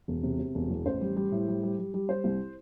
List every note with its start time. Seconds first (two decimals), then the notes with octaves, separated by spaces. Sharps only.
0.08 E1
0.23 C3
0.39 C3
0.55 E1
0.70 E2
0.86 A1 C5
1.01 G3
1.16 G3
1.32 A2
1.48 G3
1.63 G3
1.79 G3
1.94 G3
2.09 G3 C5
2.24 C2